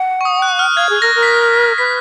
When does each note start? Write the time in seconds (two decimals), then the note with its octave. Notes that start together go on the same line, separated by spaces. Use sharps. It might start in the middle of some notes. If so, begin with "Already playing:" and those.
Already playing: F#5
0.21 C#6
0.25 D#6
0.42 F#6
0.59 F6
0.76 F5 G#6
0.89 G#4
1.02 A#4 A#6
1.15 A#4
1.23 B6
1.27 A#6
1.78 B4 B6